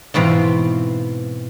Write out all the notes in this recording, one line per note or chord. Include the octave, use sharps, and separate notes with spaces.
G#2 B2 E3 C4 F4